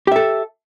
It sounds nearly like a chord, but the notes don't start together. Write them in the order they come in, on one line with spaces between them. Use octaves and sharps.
G4 E5 A4